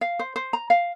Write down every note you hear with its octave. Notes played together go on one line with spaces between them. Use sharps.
F5
C5
C5
A#5
F5